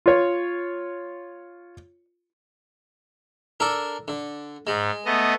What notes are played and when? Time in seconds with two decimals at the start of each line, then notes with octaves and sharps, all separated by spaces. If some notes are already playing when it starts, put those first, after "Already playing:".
0.06 F4 C#5
3.60 D4 A4 A#4
4.08 D3
4.67 G#2 G#3
5.05 A3 B3 D#5